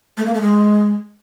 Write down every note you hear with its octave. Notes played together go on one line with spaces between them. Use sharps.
A3
A#3
A3
G#3